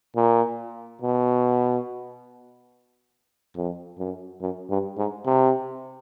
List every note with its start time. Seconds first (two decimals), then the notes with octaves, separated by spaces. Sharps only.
0.16 A#2
1.02 B2
3.56 F2
3.99 F#2
4.41 F#2
4.70 G2
4.98 G#2
5.26 C3